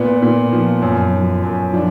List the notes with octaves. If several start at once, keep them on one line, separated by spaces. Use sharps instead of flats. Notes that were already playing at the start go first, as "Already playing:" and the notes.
Already playing: A#2 B3
A#2
F3
F#2
F3
F#2
F3 D4